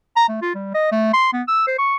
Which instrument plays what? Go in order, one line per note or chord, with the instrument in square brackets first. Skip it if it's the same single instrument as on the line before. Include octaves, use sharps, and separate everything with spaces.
[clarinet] A#5
A3
F4
G3
D#5
A3
C6
B3
E6
C5
C#6